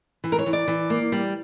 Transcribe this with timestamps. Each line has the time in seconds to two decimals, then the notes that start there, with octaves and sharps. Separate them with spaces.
0.24 E3
0.32 A#4
0.39 C#5
0.46 E3
0.53 D5
0.68 E3
0.90 A#3
1.12 G3